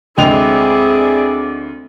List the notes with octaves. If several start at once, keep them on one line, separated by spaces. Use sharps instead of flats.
D2 G#3 C4 E4 G#4 D5 G5 F7